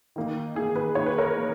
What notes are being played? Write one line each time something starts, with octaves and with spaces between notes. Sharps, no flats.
D#3 A#3 D#4
D#3 A#3 D#4 G#4
G#4 B4
D#3 A#3 D#4 C#5
B4
A#4 C#5
D#3 A#3